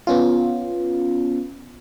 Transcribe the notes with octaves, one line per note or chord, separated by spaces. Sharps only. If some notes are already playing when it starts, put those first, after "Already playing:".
B3 C#4 F4